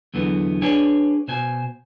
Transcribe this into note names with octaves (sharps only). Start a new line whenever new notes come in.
E2 D3 E3 F#3 B3
D4 G#4 B4 C#5 F#5 G#5
B2 C5 G#5